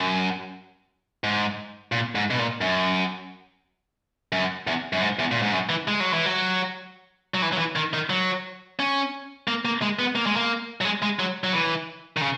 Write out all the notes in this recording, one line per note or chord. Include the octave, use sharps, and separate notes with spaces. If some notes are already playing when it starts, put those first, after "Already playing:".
Already playing: F#2
G#2
A#2
G#2
B2
A#2
F#2
F#2
E2
F#2
G#2
E2
A#2
G#2
F#2
E3
G#3
F#3
E3
F#3
F#3
E3
F#3
E3
D#3
D#3
F#3
C#4
A#3
A#3
G#3
B3
A#3
G#3
A#3
F#3
G#3
G#3
F#3
F#3
E3
D#3
C#3